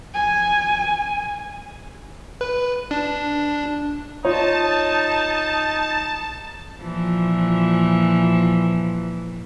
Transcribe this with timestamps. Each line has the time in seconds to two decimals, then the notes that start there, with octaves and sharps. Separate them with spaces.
0.14 G#5
2.41 B4
2.91 D4
4.25 D#4 F4 C#5 A5
6.81 A#2 E3 F3